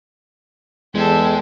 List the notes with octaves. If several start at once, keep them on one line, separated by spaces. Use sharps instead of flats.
E2 G#3 G4 A4